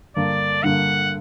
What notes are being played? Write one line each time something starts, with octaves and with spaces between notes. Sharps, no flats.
G2 D3 A#3 D5
G2 D3 A#3 F#5